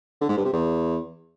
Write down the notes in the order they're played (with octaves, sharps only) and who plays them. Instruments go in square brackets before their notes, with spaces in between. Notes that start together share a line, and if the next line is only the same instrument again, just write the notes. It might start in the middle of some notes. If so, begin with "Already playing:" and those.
[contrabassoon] D3
G#2
G2
C3
E2